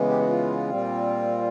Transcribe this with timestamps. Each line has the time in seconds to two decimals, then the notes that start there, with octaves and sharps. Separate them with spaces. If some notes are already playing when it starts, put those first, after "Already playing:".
Already playing: C#3 E3 G#3 B3
0.10 G4
0.19 F#4
0.29 F4
0.69 A#2 G3 C4